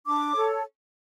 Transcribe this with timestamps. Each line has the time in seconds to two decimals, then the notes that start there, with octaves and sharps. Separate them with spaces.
0.06 D4 D6
0.33 A4 C#5